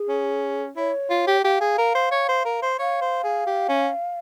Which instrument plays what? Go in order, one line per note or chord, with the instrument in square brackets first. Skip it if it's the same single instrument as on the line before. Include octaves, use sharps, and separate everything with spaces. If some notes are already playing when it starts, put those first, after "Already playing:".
Already playing: [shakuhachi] G#4
[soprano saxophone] C#4
[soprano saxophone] E4 [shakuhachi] C#5
[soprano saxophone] F4
G4
[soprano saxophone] G4 [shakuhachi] F5
[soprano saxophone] G#4
A#4
C5
C#5
C5
A#4
C5
[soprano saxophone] C#5 [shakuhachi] F5
[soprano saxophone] C5
G#4
G4
C#4